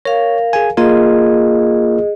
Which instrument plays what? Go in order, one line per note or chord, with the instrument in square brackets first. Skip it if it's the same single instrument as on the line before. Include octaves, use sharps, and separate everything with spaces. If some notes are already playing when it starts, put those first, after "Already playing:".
[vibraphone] A#4 F5 [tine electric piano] C#5
[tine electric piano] G#4 G#5
[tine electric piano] A#3 F4 A#4 [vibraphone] G#4 D#5